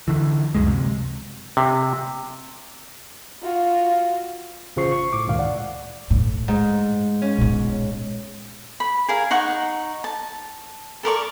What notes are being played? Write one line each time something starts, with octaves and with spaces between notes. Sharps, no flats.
D3 E3
C#2 F#2 G#3
C3
C3
F4 F#4
A1 C#3 F4 C5 C#6 C7
C#6
A2 D6
C#2 G2 A#2 D#3 F5
D5 F#5
A2
G#2
C#4
A#2 B3
B5
G#4 A#4 F5
D#4 F#5 C#6
A5
A4 A#4 D5 C#6